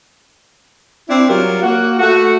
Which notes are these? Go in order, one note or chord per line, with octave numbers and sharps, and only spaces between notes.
C4 D4 E4
F#3 G3 F4 A#4
A#3 F#4
A3 F#4